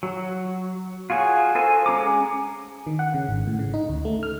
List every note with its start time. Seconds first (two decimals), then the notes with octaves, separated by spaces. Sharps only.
0.03 F#3
1.10 F4 F#4 G#4 C#5
1.55 A4 C5 D#5 G#5
1.86 G#3 C#4 A#5 D6
2.87 D#3
2.99 F#5
3.14 C#3
3.29 G#1
3.47 A2
3.59 C#3
3.74 D#4
3.89 D2
4.05 A3
4.23 F6